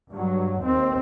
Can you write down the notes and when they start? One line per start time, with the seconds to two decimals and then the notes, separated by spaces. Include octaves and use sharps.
0.11 G2 F#3
0.62 D#2 C4